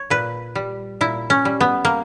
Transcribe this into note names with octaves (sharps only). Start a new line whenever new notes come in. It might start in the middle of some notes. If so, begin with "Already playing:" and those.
Already playing: C#5
A#2 B4
G3
A#2 E4
C#4
G3
B3
A#3